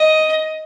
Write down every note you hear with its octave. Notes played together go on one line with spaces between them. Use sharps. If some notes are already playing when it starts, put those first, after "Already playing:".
Already playing: D#5